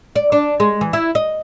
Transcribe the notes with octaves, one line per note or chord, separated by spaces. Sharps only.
D5
D4
G#3
E3
E4
D#5